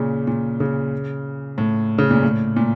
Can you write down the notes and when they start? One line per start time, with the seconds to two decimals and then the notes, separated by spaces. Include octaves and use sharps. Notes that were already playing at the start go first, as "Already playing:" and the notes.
Already playing: A#2 C#3
0.27 A#2
0.60 C#3
1.58 A2
1.98 C#3
2.11 A#2
2.23 A2
2.56 A#2